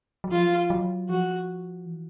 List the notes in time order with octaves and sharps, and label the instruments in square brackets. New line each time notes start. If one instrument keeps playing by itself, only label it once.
[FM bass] F#3
[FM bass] F3 [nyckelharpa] F4
[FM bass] F#3
[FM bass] F3 [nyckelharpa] F#4
[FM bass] E3